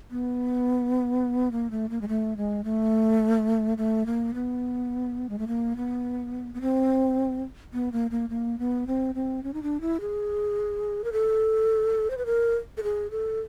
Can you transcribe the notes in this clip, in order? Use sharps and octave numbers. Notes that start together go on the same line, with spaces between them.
B3
A#3
A3
A#3
G#3
A3
G#3
A3
A3
A#3
B3
G#3
A3
A#3
B3
B3
C4
B3
A#3
A#3
A#3
B3
C4
C4
C#4
D#4
D4
E4
G#4
A#4
A4
C5
B4
A#4
A4
G#4
A4